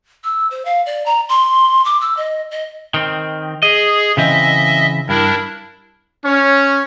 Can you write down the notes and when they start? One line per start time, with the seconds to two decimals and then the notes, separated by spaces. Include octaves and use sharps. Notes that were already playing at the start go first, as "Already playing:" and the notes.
0.24 E6
0.51 C5
0.65 F5
0.86 D5
1.06 A#5
1.29 C6
1.85 D6
2.01 E6
2.17 D#5
2.51 D#5
2.94 D#3 C4
3.63 G#4 D#5
4.17 C#3 E3 C4 D#5 E5
5.09 G2 D4 E4 A#4
6.24 C#4 C#5